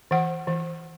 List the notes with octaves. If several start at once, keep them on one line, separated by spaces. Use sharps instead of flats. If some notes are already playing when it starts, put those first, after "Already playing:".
E3 F#5
E3